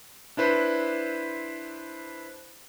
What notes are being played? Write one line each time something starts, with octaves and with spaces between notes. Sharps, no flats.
D4 E4 B4 C5